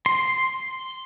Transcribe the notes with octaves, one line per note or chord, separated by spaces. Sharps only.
C6